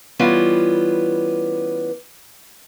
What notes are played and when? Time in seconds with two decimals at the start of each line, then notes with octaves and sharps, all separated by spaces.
0.19 E3 G3 B3 C#4 F4